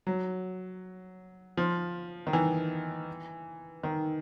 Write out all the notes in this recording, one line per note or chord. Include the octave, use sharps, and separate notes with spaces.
F#3
F3
D#3
E3
D#3